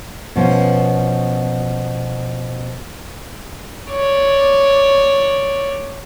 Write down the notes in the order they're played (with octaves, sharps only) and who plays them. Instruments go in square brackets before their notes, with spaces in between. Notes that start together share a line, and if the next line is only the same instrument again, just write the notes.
[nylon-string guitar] B2 F3 C#4
[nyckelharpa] C#5 D5